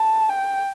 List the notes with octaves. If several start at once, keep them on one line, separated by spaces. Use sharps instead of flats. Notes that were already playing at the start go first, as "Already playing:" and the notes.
Already playing: A5
G5